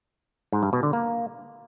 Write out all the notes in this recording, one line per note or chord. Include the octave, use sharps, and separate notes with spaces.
G#2
G2
B2
D3
A#3